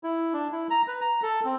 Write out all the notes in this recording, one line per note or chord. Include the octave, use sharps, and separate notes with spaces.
E4
D4
E4
A#5
B4
A#5
A4
C4